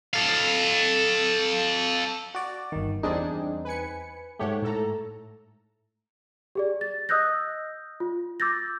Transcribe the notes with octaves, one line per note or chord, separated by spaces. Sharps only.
A4 F5
F#4 D5
G1 D#3
E2 G3 C4 D4 D#4 G#4
B4 G#5 C#7
G#2 A3 G4 C#5 F#5
A2 A4 A#5
G4 G#4 D5
A6
D#5 D#6 E6 F#6 G6 A#6
F4
D6 E6 G6 A6 A#6